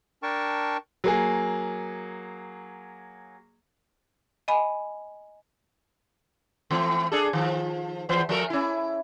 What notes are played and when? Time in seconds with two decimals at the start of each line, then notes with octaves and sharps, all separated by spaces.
0.23 D4 A#4 G5 A5 C#6
1.04 F#3 A#3 G#4
4.48 D#5 G#5 B5
6.70 E3 A3 C4
7.12 D4 G#4 A4
7.33 D#3 F3
8.09 E2 E3 C5
8.29 F3 A3 A#4
8.50 C#4 E4